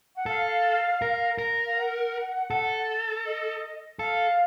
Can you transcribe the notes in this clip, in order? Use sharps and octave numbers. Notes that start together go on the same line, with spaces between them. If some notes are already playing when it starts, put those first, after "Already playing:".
F#5
A4 F5
A#4
A#4
F5
F#5
A4
D#5
A4 F5